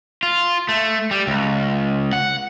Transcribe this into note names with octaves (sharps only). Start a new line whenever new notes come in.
F4
A3
G3
C#2
F#5